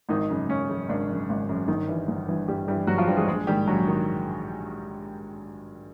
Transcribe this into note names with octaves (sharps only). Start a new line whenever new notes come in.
G#1 D#3 D#4
F#2 C#3
G#1 C#4
F#2 C#3
G#1 D4
F#2 C#3
G#1
F#2 C#3
G1 D#3 D#4
G2 E3
G1
G2 E3
G1 G3 G4
G2 E3 G3 G4
G1 F#3 F#4
F3 F4
G2 E3 G3 G4
G#3 G#4
A#1 G#3 G#4
G#2 D#3 G3 G4
A#1 F#3 F#4
D#3